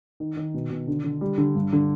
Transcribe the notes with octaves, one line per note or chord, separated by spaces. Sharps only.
D#3
D#3
B2
B2
D3
D3
G3
D3
G2
D3